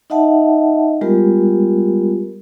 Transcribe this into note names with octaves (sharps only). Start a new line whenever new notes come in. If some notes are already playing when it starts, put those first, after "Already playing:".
D#4 D#5 E5 F#5 A5
G3 G#3 B3 F4 G4 A#4